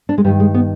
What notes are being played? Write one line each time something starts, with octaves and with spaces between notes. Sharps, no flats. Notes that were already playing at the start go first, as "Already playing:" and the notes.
D4
G#3
G2 D#3 G3
G#3
B3